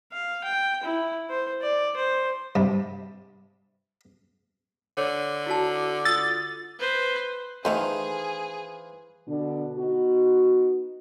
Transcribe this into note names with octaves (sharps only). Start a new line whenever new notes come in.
F5
G5
E4
C5
D5
C5
G2 C3
D3 C#5
E4 F#4 A5
F4 D#6 E6 A6
B4 C5
D#3 E3 A3 G#4 B4 C5 F5
B2 D3 D4
B3 D#4 F#4